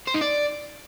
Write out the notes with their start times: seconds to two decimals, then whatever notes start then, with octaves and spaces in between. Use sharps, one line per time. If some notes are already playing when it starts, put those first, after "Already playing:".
0.08 C5
0.15 D#4
0.22 D5